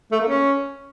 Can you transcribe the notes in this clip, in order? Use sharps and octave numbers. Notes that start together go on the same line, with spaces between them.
A3
A#3
C#4